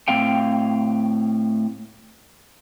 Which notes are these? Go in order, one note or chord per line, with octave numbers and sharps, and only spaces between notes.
A2 C4 F5 G5